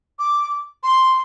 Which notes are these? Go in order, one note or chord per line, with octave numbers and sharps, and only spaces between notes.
D6
C6